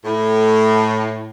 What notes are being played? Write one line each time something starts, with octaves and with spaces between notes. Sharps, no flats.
A2